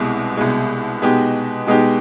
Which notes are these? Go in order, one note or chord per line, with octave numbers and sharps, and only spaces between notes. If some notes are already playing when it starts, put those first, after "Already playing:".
Already playing: C2 B2 G#3
C2 B2 G#3
B2 G#3 B3 D#4 G4
B2 G#3 B3 D#4 G4